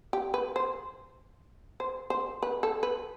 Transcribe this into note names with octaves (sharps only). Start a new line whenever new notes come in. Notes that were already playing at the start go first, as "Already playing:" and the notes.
G4
B4
C5
C5
C5
B4
A4
B4